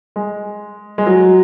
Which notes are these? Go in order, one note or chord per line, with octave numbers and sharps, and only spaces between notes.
G#3
G#3
F#3